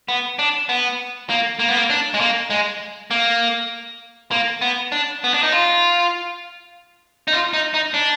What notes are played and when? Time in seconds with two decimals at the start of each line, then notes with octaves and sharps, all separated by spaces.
0.09 B3
0.39 D4
0.69 B3
1.30 A#3
1.59 A#3
1.68 B3
1.77 A#3
1.90 D4
2.14 G#3
2.20 A#3
2.50 G#3
3.11 A#3
4.31 A#3
4.62 B3
4.92 D4
5.24 B3
5.34 D4
5.43 D#4
5.52 F4
7.28 D#4
7.33 F4
7.54 D#4
7.74 D#4
7.94 D4